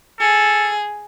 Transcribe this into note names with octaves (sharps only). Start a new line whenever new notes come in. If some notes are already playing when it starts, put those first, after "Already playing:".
G#4 A4